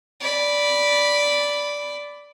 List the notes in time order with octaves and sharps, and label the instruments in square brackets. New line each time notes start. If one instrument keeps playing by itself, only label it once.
[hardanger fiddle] D5 B5